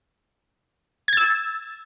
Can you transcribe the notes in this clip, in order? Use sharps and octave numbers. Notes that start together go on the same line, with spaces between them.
E6 G#6 A6